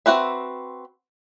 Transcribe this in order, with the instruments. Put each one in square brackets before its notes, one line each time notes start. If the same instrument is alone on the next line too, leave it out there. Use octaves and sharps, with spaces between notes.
[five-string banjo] C4 F#4 B4 E5